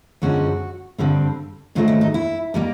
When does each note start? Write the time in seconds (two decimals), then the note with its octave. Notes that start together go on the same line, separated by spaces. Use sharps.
0.22 F#2 D3 F3 G#3 C#4 F#4
0.98 G2 D3 G3 C4
1.75 G#2 D#3 F#3 A3 F4
1.88 E4
2.01 D#4
2.14 E4
2.54 D#3 G3 A#3